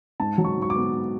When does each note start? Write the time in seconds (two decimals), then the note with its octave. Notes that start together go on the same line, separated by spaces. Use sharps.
0.20 G#2 A5
0.38 F#3
0.45 C#6
0.58 G#2 C#6
0.70 D6
0.76 B3